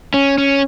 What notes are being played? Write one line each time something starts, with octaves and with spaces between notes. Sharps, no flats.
C#4
C#4